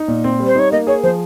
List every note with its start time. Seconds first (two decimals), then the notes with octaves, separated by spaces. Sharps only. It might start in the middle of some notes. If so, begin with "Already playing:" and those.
Already playing: D#4
0.08 A#2
0.24 C4
0.40 G3
0.46 C5
0.56 D#4 C#5
0.72 A#3 D#5
0.87 G#4 C#5
1.03 F3 C5